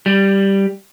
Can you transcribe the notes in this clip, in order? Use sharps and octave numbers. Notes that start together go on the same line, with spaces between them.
G3